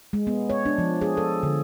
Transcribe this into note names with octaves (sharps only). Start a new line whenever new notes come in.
G#3
B3
C#5
D4
F3
G#4
A4
D3